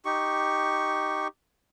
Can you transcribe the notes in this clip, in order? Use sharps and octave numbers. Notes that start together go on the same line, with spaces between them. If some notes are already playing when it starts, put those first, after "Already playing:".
D#4 G4 C#6